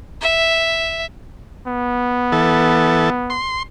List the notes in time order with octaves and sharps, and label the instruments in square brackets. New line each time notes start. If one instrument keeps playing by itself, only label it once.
[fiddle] E5
[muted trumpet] B3
[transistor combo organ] E3 A4
C6